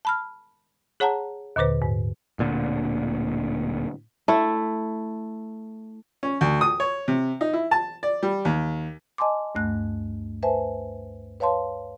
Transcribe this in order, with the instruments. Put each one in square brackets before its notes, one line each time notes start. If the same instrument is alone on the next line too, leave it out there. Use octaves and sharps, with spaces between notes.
[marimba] A5 B5 F6
G#4 C#5 F#5 A5 A#5
D#2 A#2 D3 B4 C5
G#2
[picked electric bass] D1 A#2 D3
[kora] A3 E4
[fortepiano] C#4
D2
D#6
C#5
C3
D#4
E4
A5
D5
G3
D#2
[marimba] D#5 G#5 A5 C6 D6
D2 G2 A3 F#6
B4 C5 E5 G#5 A5
B4 C#5 F5 A5 C6